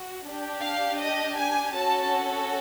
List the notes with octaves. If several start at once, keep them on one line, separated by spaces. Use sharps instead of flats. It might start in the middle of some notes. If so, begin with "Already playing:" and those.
Already playing: F#4
D4 G4
F5
D#5
G#5
C#4 F#4 A4 A5